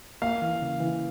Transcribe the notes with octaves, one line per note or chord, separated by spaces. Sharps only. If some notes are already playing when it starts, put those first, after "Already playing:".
A#3 F5
E3
C#3
E3